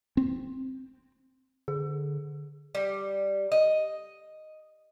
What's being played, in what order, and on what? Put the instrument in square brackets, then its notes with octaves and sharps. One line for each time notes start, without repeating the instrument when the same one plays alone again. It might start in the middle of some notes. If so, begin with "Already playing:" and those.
[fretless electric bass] C4
[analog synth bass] D3 [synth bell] G#4
[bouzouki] G3
D#5